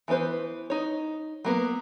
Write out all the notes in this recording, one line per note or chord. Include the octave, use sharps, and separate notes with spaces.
E3 B3 D4 B4 C5
D#4 C#5
F#3 A#3 B3